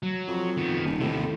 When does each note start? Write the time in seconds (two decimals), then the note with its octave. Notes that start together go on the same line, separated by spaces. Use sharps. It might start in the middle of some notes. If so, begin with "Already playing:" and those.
0.03 F#3
0.28 F2
0.57 D#3 B3
0.85 D#1
1.00 D#2 A2 C3